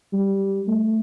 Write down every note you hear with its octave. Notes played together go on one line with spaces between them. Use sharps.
G3
A3